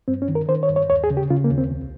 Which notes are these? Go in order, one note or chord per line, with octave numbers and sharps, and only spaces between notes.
G2 C4
C#4
D#3
A#4
D#3 C5
C#5
G2
C#5
D#2 C#5
G#4
C#3
G4
C#3 F4
A#3
D#2
C4
C2